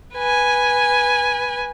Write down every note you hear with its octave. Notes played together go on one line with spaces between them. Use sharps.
B4 G#5